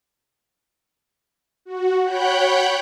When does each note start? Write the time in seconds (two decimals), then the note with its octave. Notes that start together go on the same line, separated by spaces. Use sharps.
1.65 F#4
2.05 C#5 F#5 G5 B5 F#6 G6